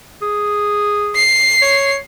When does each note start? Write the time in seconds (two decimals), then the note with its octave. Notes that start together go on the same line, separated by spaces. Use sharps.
0.22 G#4
1.16 C7
1.62 C#5